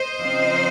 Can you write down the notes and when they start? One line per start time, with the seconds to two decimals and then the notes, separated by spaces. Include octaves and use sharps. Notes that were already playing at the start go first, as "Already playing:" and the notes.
Already playing: C5 D#5
0.21 C#3 F3 C4 D#4